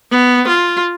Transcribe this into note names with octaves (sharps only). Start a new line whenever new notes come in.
B3
F4